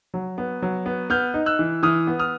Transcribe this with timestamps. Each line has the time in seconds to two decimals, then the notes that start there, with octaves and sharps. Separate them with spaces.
0.14 F#3
0.38 B3
0.62 F#3
0.86 B3
1.10 B3 F6 G6
1.34 D#4
1.46 E6 F#6
1.59 E3
1.83 E3 D#6 F6
2.07 B3
2.19 D#6 F6